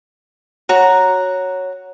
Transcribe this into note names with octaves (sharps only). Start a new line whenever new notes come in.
F#4 C#5 A#5